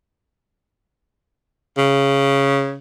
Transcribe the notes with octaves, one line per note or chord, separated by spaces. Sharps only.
C#3